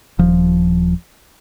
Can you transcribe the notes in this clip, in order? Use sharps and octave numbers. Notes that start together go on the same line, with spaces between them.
D#1 F3